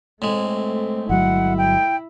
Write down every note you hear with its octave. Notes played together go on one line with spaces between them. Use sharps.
A2 G#3 A3 C4
G1 F#3 E4 F#5
G5